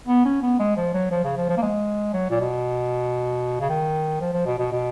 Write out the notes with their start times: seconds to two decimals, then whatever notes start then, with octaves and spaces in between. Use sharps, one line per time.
0.07 B3
0.25 C#4
0.42 B3
0.59 G#3
0.76 F3
0.94 F#3
1.11 F3
1.24 C#3
1.37 F3
1.49 F3
1.57 A#3
1.62 G#3
2.13 F#3
2.30 A#2
2.40 B2
3.60 C#3
3.69 D#3
4.21 F3
4.33 F3
4.46 B2
4.58 B2
4.72 B2